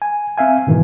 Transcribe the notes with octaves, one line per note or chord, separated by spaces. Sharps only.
G#5
C4 E5 F5 G#5
G#2 B2 D#3 E3